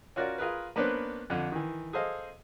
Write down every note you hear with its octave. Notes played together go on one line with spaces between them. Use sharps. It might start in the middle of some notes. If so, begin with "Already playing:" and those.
C#4 F4 F#4 A#4 D5
F4 G#4 A#4 B4
A#3 B3 C#4 D4 B4 C5
F2 D3
D#3 E3
G#4 A4 C5 D#5 F5